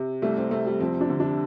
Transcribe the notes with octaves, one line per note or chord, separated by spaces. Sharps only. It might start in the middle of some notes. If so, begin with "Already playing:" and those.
Already playing: C3
C2 A3
C4
C3 A3
G3
F2 C4
D4
D3
D4